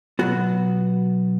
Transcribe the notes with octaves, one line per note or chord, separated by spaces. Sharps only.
B2 F#3 B3 F#4